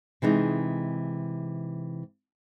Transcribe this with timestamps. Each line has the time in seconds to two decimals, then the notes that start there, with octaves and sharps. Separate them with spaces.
0.22 C3 E3 G#3 D#4